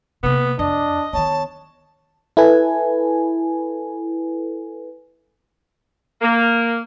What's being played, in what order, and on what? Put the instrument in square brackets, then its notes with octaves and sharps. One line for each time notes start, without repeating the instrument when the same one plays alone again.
[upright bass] C3 A#3 [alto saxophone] B3
[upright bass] F2 [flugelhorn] D4 [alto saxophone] D#5
[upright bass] D#3 B3 [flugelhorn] C#5 [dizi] A5
[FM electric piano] E4 A4 B4 G#5
[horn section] A#3